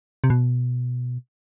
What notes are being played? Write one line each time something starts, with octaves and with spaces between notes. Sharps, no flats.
C3
B2